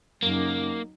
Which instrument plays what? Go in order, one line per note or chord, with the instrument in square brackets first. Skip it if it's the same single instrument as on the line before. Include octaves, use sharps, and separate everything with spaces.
[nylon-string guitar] F#2 C#3 [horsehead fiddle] F#3 D#4 [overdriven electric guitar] A#3